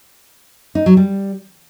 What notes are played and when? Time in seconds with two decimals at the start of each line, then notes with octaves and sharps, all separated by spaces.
0.75 D#4
0.86 F#3
0.97 G3